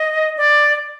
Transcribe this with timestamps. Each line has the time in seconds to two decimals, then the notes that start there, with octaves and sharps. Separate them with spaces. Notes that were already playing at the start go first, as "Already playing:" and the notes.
Already playing: D#5
0.37 D5